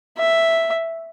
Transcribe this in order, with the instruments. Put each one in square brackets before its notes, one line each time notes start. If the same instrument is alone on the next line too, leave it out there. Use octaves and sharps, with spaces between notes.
[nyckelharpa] E5